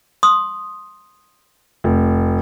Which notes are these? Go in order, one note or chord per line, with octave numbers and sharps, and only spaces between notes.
C6 D#6
F1